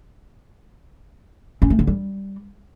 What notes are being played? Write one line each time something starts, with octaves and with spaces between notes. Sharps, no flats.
C#4
A3
D3
G3